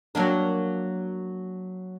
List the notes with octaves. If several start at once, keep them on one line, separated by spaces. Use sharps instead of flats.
F#3 A#3 D4